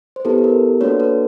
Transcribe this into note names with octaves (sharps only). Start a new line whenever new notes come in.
C5
B3 E4 G4 A4 B4
A4
A#4
A#3 D4 F#4 A4 B4 C#5
A4 B4